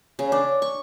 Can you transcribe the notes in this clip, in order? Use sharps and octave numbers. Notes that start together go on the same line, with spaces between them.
C#3
D4
C#6